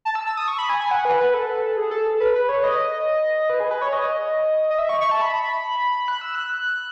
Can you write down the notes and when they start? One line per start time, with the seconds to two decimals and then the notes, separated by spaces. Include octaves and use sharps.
0.05 A5
0.15 E6
0.26 E6
0.37 D#6
0.48 C#6
0.59 B5
0.69 G#5
0.80 G#5
0.91 F#5
1.05 B4
1.20 B4
1.34 A4
1.77 G#4
1.91 A4
2.20 B4
2.35 B4
2.49 C#5
2.64 D#5
3.50 B4
3.60 G#4
3.71 B4
3.82 C#5
3.93 D#5
4.70 D#5
4.79 E5
4.89 C#6
5.01 C#6
5.11 A5
5.21 B5
6.08 F#6
6.21 E6
6.35 F#6